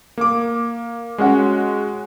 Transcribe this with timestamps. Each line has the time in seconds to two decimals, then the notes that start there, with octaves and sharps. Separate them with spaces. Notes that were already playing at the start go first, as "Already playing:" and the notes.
0.18 A#3 D6
1.18 G#3 C#4 F#4 F#5